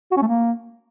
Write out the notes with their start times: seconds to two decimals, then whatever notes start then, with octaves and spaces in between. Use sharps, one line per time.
0.12 F#4
0.17 C#4
0.22 A3
0.27 A#3